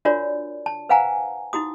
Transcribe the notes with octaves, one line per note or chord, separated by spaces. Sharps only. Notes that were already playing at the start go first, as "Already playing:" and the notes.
D4 F4 F#4 A#4 C#5 D5
A5
B4 C5 F5 F#5 G#5 A#5
D#4 E4 F#4 D#6